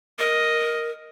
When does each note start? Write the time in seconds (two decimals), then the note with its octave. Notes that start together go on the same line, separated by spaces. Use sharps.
0.19 A#4 D#5